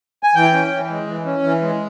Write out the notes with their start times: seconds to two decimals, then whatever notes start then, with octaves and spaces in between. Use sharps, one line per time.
0.23 G#5
0.35 E3 G5
0.53 C#4
0.71 E3
0.90 G#3
1.07 E3
1.25 C#4
1.43 E3
1.62 G#3